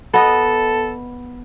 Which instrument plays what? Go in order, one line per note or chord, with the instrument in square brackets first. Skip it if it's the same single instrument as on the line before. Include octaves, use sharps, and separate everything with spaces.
[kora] B3 D#5 [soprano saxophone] A4